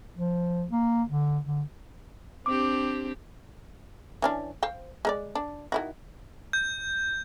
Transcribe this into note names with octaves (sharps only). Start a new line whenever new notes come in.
F3
A#3
D3
D3
C4 D4 G4 D6
E3 C#4 D4
C5 F5 G5
G#3 A#4 D5
D4
D#3 E4 F#4
G6